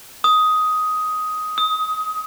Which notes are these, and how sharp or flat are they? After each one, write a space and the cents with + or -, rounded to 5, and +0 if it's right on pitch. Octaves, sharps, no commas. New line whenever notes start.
D#6 +10
D#6 +25